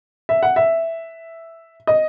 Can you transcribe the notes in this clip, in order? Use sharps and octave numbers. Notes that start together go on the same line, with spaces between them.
E5
F#5
E5
D#5